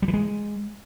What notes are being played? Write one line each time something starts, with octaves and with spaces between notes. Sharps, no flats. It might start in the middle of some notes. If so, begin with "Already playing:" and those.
G3
E3
G#3